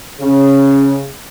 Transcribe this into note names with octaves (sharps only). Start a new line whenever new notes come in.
C#3